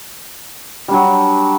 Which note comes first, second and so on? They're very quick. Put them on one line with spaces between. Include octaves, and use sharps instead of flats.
G3 D4 F#3